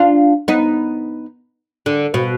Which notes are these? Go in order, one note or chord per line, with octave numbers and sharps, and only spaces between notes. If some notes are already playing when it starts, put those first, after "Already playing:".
Already playing: D4 F4
B3 D#4
D3
B2